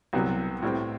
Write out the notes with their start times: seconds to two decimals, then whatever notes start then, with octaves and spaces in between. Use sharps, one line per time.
0.13 C2 C3 F#3 B3
0.62 A2 G3 C4